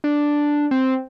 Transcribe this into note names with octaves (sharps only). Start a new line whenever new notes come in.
D4
C4